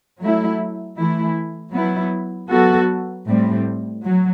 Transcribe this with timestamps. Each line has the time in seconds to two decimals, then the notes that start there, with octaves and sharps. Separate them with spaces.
0.20 F#3 A3 E4
0.97 E3 A3 E4
1.73 F#3 B3 E4
2.50 F#3 B3 F#4 A4
3.27 A2 G3 C4
4.04 F#3